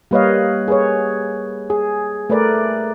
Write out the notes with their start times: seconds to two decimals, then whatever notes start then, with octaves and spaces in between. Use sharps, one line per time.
0.11 G3 A#3 B4 C#5 D#5 F5
0.68 G#4 B4 C#5
1.70 G#4
2.30 A3 A#4 B4 D5